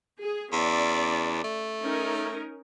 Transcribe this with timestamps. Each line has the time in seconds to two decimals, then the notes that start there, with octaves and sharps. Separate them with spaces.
0.22 G#4
0.52 E2 C#4 D5
1.44 A3
1.82 C#4 D#4 A#4